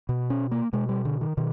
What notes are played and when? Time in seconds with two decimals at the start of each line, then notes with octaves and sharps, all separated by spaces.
0.09 B2
0.30 C#4
0.51 A#3
0.73 B2 G#3
0.89 G3
1.05 D3
1.21 D#3
1.37 B2 D#3